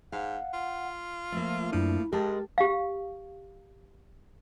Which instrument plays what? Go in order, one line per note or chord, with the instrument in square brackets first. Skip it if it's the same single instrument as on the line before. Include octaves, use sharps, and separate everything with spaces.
[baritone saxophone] G#2 [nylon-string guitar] F5 [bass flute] F#5
[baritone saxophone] F4
[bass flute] F3 [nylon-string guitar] A3 A#3
[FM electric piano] F#2 D4 [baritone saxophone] F3 [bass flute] E4
[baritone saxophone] G2 [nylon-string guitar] G#3 [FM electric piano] G4 A5 [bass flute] A#4
[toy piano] G4 F5